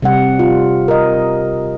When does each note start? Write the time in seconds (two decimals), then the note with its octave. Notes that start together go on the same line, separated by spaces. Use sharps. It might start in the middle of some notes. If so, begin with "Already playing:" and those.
0.02 C3 G3 F#5
0.39 F4
0.88 A#4 D#5